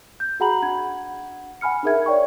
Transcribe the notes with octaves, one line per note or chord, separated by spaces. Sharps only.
G6
F#4 G#4 F#5 A#5 B5 F#7
D4 F#5 G#6
F#5 G#5 B5 F6 C#7
D4 D#4 G#4 A#4 E5 G#6
C#5 D5 G5 C#6